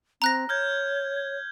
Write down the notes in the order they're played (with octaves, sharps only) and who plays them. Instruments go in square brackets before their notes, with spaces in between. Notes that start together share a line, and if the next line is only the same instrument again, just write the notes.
[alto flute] C4 [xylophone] A#5 F#6 A#6
[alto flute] C#5 [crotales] F6 G6 G#6